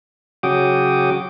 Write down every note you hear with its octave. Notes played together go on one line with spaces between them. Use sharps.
C#3 F#3 F#4 G5 D6 D#6